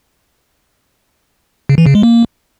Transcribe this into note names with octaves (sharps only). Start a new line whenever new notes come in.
C#3
E3
C#3
G#3
A#3